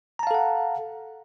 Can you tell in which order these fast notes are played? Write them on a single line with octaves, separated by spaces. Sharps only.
A#5 A5 F5 A4 F#5